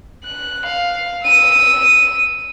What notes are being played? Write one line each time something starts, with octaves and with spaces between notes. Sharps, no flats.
F#6
F5
E6 D#7